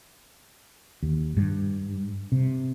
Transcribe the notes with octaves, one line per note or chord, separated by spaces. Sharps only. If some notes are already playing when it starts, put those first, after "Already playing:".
D#2
G2
C3